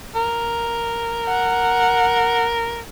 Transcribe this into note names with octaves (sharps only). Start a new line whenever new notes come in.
A#4
F#5